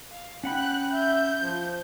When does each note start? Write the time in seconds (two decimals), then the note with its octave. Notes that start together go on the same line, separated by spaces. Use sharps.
0.11 F5
0.44 C#4 F#5 G5 B5 F#6
0.92 E5 G6
1.42 F3